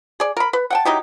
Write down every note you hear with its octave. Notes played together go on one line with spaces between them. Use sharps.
G#4 D5
A#4 B5
B4
F#5 G5 A5
F#3 D#4 E4 G4